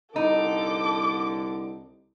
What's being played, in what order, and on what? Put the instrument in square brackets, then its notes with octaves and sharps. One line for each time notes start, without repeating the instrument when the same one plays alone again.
[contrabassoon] C2 [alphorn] D3 [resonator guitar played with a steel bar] D#4 [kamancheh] A4 D6